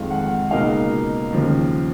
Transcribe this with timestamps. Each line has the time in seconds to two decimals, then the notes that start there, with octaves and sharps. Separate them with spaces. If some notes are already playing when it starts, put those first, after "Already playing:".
Already playing: F2 D#3 G#3 F5
0.11 F#5
0.51 C#2 B2 A#3 D#4 F5
1.33 D#2 C#3 F3